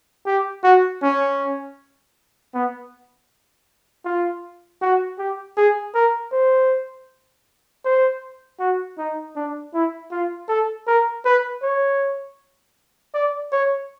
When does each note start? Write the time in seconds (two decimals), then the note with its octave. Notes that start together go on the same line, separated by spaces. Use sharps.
0.26 G4
0.64 F#4
1.03 C#4
2.54 B3
4.05 F4
4.82 F#4
5.19 G4
5.57 G#4
5.94 A#4
6.32 C5
7.84 C5
8.60 F#4
8.98 D#4
9.36 D4
9.74 E4
10.11 F4
10.48 A4
10.87 A#4
11.25 B4
11.62 C#5
13.14 D5
13.52 C#5